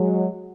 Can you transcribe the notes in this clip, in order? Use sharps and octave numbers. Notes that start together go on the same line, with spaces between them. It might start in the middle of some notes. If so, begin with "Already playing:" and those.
Already playing: F#3 G#3